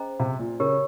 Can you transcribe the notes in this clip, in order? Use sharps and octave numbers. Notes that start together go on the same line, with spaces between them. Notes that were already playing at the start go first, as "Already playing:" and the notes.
Already playing: C#4 G#4 C5 D#5 A#5
C3
A#2
C#3 G4 A#4 C#5